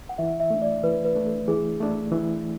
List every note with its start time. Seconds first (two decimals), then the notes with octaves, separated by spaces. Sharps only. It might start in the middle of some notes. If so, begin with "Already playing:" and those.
0.09 F#5
0.18 E3 E5
0.40 E5
0.50 A3 D4
0.62 D5
0.83 E3 B4
1.05 B4
1.15 A3 D4
1.26 A4
1.48 E3 G#4
1.80 A3 D4
2.12 E3